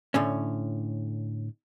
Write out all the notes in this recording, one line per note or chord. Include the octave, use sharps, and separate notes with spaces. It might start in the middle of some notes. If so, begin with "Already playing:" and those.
A2 D3 C#4